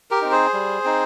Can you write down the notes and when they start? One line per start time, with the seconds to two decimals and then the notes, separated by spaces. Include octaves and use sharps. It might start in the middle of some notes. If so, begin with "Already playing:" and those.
0.11 G4 A#4
0.21 C4 D#4
0.32 G#4 C5
0.53 G3
0.84 C4 D#4